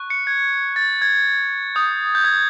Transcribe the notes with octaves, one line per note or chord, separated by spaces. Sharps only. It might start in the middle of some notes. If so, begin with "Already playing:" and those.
Already playing: C#6 F#6
C#7
G#6
A6
G#6
D#6 G6
G6
G#6